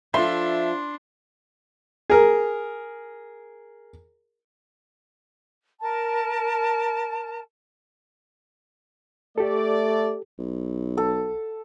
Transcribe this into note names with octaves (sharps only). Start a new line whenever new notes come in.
F3 D4 F4 A4 E5 C6
G#4 A#4
A#4 A5
A3 G4 A4 D5
B1
A4